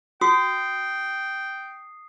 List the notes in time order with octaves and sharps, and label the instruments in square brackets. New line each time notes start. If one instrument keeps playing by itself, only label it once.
[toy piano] F#4 [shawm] G5 [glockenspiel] D#6 C7